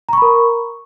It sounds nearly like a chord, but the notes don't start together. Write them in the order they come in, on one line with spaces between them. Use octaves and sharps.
A#5 C#6 B5 A#4